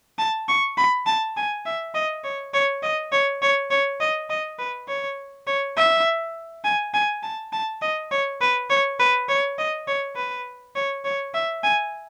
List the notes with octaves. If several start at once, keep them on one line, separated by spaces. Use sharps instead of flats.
A5
C#6
B5
A5
G#5
E5
D#5
C#5
C#5
D#5
C#5
C#5
C#5
D#5
D#5
B4
C#5
C#5
E5
G#5
G#5
A5
A5
D#5
C#5
B4
C#5
B4
C#5
D#5
C#5
B4
C#5
C#5
E5
G#5